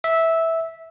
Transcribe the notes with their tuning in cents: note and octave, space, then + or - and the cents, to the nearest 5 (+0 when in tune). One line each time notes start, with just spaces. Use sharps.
E5 -10